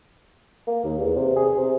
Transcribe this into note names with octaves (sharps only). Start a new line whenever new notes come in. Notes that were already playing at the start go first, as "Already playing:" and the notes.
A#3
D#2
E2
C3
G#4
C3